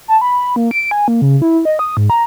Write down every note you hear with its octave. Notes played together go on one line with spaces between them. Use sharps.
A5
B5
A#3
D7
G#5
A#3
C#3
E4
D#5
D#6
G#2
A#5